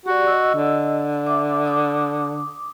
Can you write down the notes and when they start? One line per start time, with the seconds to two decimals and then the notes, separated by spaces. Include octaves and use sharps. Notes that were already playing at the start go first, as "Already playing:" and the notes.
0.06 F#4 G4 D5
0.27 D#5 E6
0.55 D3
1.27 E5 D6
1.65 D6 D#6